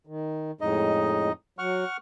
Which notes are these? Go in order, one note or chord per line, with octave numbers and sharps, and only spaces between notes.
D#3
F2 A2 G#3 D#4 D#5
F#3 F#5 C#6 F6